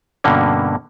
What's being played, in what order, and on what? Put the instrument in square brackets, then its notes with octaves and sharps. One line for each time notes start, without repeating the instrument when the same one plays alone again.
[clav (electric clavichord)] G2 B2 D3 A#3 C#4